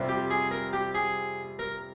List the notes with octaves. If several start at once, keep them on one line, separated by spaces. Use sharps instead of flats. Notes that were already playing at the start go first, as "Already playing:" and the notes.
Already playing: F2 C3 G3
G4
G#4
A#4
G4
G#4
A#4